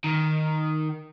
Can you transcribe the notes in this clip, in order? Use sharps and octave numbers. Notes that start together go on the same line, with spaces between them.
D#3